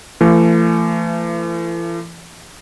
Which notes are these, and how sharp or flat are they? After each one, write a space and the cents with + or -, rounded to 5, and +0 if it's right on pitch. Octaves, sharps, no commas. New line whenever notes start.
E3 +45 A3 +30